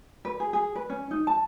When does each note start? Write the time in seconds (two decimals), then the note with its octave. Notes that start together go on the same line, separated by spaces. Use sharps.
0.25 B4
0.40 G#4
0.53 G#4
0.75 B4
0.90 C#4
1.11 D#4
1.27 A5